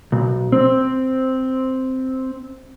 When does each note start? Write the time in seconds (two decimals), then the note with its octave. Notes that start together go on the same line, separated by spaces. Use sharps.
0.12 B1
0.52 C4